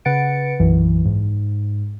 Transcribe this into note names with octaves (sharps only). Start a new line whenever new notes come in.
C#3 B4 F#5 A6 C#7 D7
B1 F#2 E3
G#2